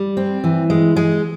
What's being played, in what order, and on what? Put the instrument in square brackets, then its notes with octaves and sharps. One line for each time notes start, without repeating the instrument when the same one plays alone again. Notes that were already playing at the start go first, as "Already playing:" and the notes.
Already playing: [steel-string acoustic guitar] G3
C4
E3
G#3
G#3